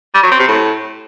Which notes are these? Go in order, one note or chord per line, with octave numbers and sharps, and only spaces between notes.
G3
F#3
C4
C3
A2